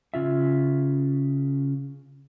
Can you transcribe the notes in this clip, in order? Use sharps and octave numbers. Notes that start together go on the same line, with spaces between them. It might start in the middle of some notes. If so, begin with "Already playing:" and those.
C#3 F4 E5